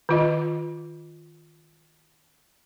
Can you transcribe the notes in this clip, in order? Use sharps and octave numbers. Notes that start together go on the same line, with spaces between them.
D#3 F4 D#5